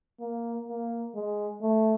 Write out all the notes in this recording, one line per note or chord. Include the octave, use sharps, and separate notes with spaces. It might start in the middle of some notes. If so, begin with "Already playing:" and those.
A#3
A#3
G#3
A3